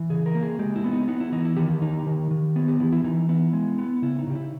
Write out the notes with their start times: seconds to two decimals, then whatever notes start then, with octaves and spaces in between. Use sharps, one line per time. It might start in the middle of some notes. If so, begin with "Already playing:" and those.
Already playing: E3
0.10 C#3 G#4
0.26 A#4
0.35 A#3
0.43 G#4
0.59 G#3 G4
0.76 E4
0.84 B3
0.91 D#4
1.08 B3 D#4
1.20 E4
1.32 E3 D#4
1.45 E4
1.57 D#3 G4
1.82 D#4
2.06 D#3
2.31 D#3
2.56 B3
2.68 G4
2.80 E3 E4
2.93 E4
3.04 E3 D#4
3.29 B3 E4
3.53 G#3
3.78 B3
4.02 C#3 E4
4.19 D#4
4.27 C#3 G4
4.35 E4